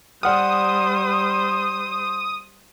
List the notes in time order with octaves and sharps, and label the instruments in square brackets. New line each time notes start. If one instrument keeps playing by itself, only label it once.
[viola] G3 C5 [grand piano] D5 F#5 F6 [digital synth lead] D#6